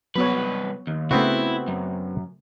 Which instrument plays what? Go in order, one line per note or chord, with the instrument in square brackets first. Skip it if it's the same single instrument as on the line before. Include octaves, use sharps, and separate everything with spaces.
[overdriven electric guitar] C2 B4 [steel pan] F#3 B3 C#5
[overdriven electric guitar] D#2
[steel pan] C#3 A3 [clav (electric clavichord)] B3 C4 F#4 [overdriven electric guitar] E4
[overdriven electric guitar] F#2